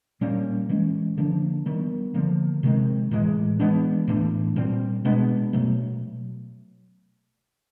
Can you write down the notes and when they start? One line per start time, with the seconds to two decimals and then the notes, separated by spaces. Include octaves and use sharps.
0.21 A#2 G3 A#3 C#4
0.69 E3 G#3 C#4
1.17 D3 F3 A#3 D4
1.66 D#3 G3 B3
2.14 D3 F3 A#3
2.63 C3 D#3 G#3 C4
3.11 A2 E3 G#3
3.59 E3 G#3 B3 D4
4.08 A2 E3 A3 D4
4.56 A#2 G3 C4
5.05 B2 G#3 B3 D4
5.53 B2 F#3 A3